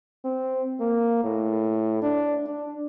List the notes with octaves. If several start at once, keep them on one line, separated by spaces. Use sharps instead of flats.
C4
A#3
A2
D4
D4